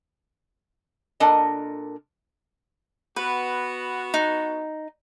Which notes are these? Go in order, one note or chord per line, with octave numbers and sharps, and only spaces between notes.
A#2 D4 A4 A#4 D#5
B3 F#4 B4
D#4